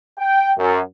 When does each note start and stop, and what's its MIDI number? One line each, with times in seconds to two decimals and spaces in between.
0.19 0.51 79
0.58 0.79 42